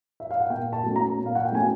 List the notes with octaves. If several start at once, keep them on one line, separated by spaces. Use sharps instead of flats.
E5
F5
F#5
A#2 G5
A5
F#3 A3 C#4
A#5
A#2
F5
F#5
G5
F#3 A3 C#4 G#5